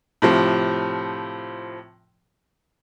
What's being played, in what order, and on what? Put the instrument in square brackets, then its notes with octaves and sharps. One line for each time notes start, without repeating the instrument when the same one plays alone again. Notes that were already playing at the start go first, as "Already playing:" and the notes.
[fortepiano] A2 C3 F3